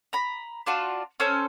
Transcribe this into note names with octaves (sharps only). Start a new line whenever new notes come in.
A#5 B5
D4 F4 F#4
C#4 A4 C5